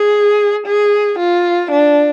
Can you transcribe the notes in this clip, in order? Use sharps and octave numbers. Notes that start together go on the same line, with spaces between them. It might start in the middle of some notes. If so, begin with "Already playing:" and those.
Already playing: G#4
G#4
F4
D4